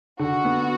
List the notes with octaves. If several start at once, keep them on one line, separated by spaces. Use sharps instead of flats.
D3 F#4
B3